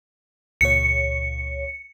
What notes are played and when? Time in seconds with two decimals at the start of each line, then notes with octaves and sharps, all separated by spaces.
0.61 C#2 A#2 C#5 C#7